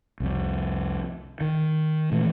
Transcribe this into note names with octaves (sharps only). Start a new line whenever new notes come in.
C2 F2
D#3
A#2 E3 A3